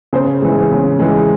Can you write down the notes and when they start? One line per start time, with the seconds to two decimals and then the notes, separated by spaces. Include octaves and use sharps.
0.13 C#3 C5
0.42 E3 G#3
0.71 C#3
0.99 E3 G#3